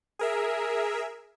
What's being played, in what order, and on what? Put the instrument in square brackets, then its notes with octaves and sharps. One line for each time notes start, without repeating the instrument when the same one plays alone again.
[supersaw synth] G#4 A#4 E5